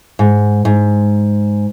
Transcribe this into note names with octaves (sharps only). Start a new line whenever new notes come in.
G#2
G#2